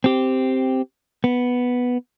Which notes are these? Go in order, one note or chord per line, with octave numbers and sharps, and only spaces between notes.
C4 G4
B3